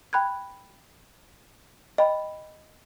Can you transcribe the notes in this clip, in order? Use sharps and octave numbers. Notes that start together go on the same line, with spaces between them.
G5 B5 F#6 G#6
D#5 G5 B5